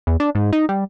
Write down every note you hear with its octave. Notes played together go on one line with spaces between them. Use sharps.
E2
D4
G#2
D#4
G3